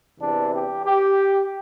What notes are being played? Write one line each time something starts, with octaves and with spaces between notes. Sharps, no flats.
E2 C3 E3 D4
G4
G4